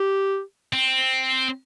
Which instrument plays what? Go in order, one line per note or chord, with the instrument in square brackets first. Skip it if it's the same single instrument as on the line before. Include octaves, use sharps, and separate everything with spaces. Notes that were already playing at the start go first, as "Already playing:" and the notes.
Already playing: [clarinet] G4
[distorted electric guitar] C4